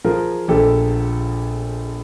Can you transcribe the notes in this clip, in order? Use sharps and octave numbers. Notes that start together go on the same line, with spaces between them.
F3 G#4 A#4
A#1 G4 A4